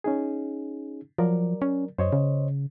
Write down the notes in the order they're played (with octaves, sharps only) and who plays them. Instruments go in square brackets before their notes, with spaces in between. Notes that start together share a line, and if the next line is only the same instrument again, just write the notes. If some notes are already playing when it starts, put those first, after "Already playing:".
[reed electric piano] C#4 D#4 G#4
[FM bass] F3 [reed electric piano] F#3 A#4 D5
[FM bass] C#4
[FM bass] F#2 [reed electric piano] C5 C#5 D#5
[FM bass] C#3